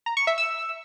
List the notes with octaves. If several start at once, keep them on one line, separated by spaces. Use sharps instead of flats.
A#5
C#6
E5
E6